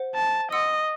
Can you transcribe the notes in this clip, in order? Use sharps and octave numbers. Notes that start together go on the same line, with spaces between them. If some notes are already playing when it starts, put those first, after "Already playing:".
Already playing: C5 F#5
A5
D#5 F#5 C6 E6